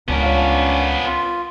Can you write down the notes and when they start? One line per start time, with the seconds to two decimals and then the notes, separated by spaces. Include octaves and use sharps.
0.08 C#2 B3 C#4 D4 A#4
0.23 C#5 F5
1.06 F4